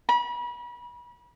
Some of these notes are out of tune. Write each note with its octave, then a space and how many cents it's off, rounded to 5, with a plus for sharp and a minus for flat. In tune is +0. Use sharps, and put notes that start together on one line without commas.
B5 -35